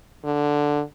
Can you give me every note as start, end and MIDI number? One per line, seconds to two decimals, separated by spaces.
0.24 0.82 50